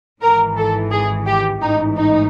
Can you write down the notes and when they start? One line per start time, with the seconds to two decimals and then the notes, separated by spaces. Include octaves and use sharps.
0.22 G#1 G#2 E3 A#4
0.57 A4
0.92 G#4
1.26 G4
1.61 A1 G#2 E3 D#4
1.96 D#4